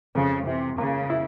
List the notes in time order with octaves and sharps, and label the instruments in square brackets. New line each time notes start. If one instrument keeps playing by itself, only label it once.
[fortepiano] F2 [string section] C#3
[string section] C3 [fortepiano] E3
[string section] C#3 [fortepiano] A#3
[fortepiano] E4